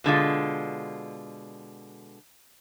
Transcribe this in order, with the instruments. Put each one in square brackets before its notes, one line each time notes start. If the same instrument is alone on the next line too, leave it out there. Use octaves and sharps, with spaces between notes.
[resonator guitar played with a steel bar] B2 D3 G#3 F4